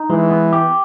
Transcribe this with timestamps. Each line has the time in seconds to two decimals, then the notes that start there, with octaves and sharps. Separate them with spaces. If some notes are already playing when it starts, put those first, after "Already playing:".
Already playing: D#4
0.10 E3 G#3
0.31 B3
0.53 G4